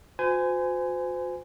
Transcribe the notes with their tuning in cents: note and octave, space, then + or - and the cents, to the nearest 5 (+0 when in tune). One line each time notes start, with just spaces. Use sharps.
F#4 -40 C5 -40 G#5 +0